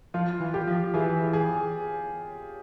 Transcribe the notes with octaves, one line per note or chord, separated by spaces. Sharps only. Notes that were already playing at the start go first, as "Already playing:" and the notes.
F3 F4
E3
G4
F3
E3 G#4
G#4